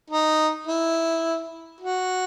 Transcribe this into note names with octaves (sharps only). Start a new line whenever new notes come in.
D#4
E4
F#4